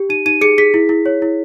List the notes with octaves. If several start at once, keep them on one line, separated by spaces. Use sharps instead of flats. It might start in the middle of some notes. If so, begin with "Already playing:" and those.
Already playing: G4
D#4 D#7
D#4 D#7
G#4 C#7
G#4 B6
E4
E4
C#5
E4